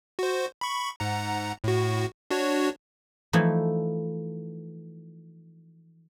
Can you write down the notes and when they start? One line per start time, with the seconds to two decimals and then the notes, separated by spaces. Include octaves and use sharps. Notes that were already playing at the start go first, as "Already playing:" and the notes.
0.19 F#4 C5
0.61 B5 C#6
1.00 G#2 F#5 A#5
1.64 A2 F#4
2.30 D4 F#4 C#5
3.33 E3 F3 A3 D#4 E4